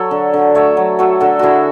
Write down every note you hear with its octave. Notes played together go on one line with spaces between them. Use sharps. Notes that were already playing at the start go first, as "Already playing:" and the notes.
Already playing: F#3 A4 C#5
D3
D3
A3 C#5 E5
F#3
F#3 A4 C#5
D3 F#4 A4
D3 E4 F#4 G#4